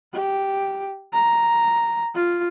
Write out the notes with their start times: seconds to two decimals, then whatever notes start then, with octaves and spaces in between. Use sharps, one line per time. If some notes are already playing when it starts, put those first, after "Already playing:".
0.14 G4
1.13 A#5
2.15 F4